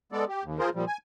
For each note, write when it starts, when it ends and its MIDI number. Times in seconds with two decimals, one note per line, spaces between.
0.12 0.25 56
0.12 0.25 59
0.12 0.25 69
0.12 0.25 74
0.28 0.43 67
0.44 0.59 39
0.59 0.69 53
0.59 0.69 65
0.59 0.69 68
0.59 0.69 70
0.59 0.69 72
0.75 0.85 46
0.75 0.85 53
0.75 0.85 55
0.87 0.97 80